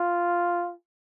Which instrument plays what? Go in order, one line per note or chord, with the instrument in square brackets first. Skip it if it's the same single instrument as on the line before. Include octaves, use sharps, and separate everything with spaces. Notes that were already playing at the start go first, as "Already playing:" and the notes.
Already playing: [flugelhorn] F4